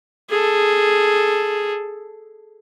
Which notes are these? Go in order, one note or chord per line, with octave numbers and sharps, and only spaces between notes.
G#4 A4